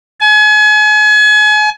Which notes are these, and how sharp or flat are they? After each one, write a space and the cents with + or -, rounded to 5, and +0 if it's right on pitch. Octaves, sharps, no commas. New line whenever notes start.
G#5 +35